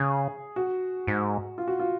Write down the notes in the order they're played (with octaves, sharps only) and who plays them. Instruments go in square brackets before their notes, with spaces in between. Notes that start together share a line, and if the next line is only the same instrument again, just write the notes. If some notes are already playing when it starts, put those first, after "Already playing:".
Already playing: [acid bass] C#3 [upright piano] G#4
[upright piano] F#4
[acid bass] G#2
[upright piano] F4
F#4
F4